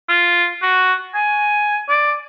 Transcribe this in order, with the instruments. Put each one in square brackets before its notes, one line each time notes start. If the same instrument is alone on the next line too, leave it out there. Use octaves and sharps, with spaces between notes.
[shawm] F4
F#4
G#5
D5